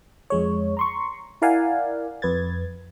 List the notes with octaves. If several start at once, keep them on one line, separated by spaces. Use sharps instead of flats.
F2 G#3 C#5
A#5 C6 C#6
E4 A#4 D5 F5 F#5 G#5
F2 B4 G#6 A6